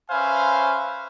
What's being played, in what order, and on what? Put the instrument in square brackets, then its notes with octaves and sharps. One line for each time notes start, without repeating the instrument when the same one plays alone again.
[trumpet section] C#4 B4 C5 E5 F5 G#5